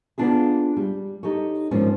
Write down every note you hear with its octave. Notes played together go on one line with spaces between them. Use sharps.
A#3 B3 D4 F4 G#4
G3
D#4 G4 A4 C#5
G#2 D#3 F3 A#3 C#4 D4